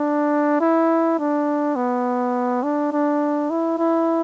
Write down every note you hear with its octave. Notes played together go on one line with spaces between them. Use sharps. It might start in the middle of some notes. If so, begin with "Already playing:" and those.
Already playing: D4
E4
D4
B3
D4
D4
E4
E4